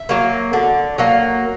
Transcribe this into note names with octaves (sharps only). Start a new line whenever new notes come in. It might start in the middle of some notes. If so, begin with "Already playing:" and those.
Already playing: E5
F#3 A#3
D3
F#3 A#3